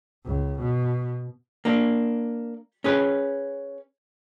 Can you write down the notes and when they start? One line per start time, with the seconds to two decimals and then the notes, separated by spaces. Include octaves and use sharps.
0.25 C#2
0.59 B2
1.65 A#3 D4
2.84 C#4 G#4 B4